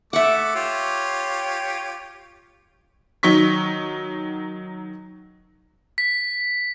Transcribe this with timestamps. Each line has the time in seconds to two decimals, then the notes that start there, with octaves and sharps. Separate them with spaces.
0.13 A3 E5 F#5 D6
0.55 F4 G4 C#5
3.23 D#3 F#3 D#4 C#6 B6
5.98 B6